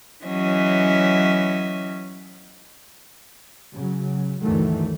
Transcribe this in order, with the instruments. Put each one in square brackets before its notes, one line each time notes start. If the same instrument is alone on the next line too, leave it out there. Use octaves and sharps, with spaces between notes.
[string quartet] E3 F#3 C#4 D#5 E5
[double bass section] C#3 F#3
D2 G2 D#3 E3 F#3 A3